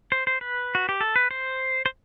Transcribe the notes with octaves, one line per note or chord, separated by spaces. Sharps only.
C5
C5
B4
F#4
G4
A4
B4
C5
C5